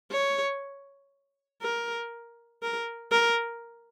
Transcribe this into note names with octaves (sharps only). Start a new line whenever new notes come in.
C#5
A#4
A#4
A#4